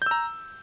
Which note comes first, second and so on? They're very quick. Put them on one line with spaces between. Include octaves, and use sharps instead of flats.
G6 E6 A#5